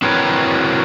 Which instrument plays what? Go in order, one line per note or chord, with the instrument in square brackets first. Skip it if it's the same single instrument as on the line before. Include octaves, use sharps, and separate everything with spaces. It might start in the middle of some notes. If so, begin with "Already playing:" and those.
[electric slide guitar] C4 E4 F#4 A#4 B4 C#5